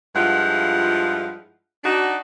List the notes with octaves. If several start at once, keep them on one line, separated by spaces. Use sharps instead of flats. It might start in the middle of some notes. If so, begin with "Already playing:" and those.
G2 F3 G#3 E4 F4 F#5
D4 D#4 F#4